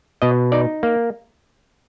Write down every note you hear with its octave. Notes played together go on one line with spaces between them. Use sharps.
B2 D#5
D#4 D5
A#3